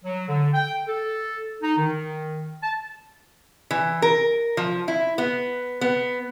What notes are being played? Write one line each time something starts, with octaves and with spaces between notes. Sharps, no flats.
F#3
D3
G5
A4
D#4
D#3
A5
E3
A#4
F3
E4
B3
B3